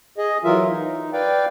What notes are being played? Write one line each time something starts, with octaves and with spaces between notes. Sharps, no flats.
G#4 D#5
E3 F#3 F4 A#4 E5
D#4
B4 D5 F5 G5